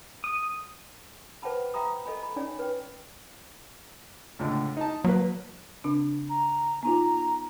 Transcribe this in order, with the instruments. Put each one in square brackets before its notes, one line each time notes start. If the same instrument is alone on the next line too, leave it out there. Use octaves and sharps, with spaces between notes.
[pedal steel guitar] D#6
[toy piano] B4 C5 F#5 G5 A5 B5
E5 G5 A#5 B5 D#6
A4 D#5 G#5 B5
B5
C#4 D#4 C#5 D5 G#5
B4 G5
[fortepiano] C#2 A2 D3
D#4 A5
[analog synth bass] F#3 [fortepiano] A#3 B4
[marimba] C#3 C4 D4
[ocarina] A#5
[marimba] B3 D#4 F4 [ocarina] A#5